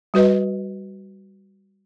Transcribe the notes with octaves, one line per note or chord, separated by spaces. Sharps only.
G3 F#4 B4 D#5